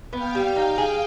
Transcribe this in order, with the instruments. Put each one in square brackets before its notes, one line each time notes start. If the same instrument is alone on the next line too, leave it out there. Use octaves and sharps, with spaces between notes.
[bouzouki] B3 [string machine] F5 G5
[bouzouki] G3
[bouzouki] D#4 [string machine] F5 G5
[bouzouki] G#4